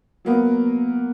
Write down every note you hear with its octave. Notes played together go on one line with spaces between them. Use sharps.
F#3 A#3 B3